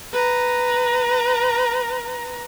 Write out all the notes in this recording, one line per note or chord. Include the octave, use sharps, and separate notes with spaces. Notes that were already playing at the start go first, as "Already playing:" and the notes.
B4 A#5